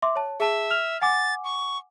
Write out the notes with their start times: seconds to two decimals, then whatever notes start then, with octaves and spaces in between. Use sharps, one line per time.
0.02 E5 C6 D6
0.16 C#5 A5
0.40 G#4 E5 A5
0.71 F6 F7
1.01 F#5 G#5 D6 A6
1.44 C#6